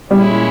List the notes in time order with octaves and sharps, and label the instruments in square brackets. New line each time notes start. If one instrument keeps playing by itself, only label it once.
[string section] A#2 G#3 C#4 E4 [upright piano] G3